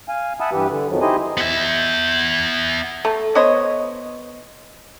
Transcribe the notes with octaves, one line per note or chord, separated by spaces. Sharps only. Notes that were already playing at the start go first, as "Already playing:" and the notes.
F5 G#5
E5 F#5 G#5 A5 B5 D#6
G2 E3 G4 B4
D3
F2 D#3 F3 F#3
D#4 E4 G4 C5 D#5 G#5
B3 E5
A3
B3 C5 C#5 D#5